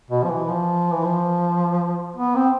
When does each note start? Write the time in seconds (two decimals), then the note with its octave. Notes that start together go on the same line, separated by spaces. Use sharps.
0.10 B2
0.24 F3
0.29 E3
0.48 F3
0.92 E3
1.04 F3
2.16 B3
2.35 C4